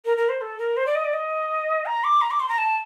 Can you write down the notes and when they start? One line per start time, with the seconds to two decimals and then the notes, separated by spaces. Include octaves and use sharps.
0.05 A#4
0.17 A#4
0.29 C5
0.41 A4
0.59 A#4
0.77 C5
0.86 D5
0.95 D#5
1.04 D5
1.13 D#5
1.86 A#5
2.04 D6
2.21 A#5
2.31 D6
2.40 C6
2.49 A#5
2.58 A5